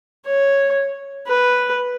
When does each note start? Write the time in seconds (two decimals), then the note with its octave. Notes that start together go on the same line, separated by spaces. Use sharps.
0.26 C#5
1.27 B4